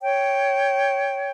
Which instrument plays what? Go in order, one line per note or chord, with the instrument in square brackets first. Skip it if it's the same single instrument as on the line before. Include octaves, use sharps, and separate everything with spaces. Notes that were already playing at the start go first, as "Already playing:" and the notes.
[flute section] C#5 G5